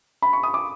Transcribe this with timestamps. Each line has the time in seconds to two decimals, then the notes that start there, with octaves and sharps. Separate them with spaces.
0.22 B5
0.33 C#6
0.43 D#6
0.54 D6